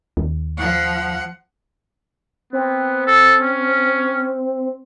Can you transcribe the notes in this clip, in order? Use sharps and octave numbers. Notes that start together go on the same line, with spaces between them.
D#2
F3 F#5
B3 C4
A4
C#4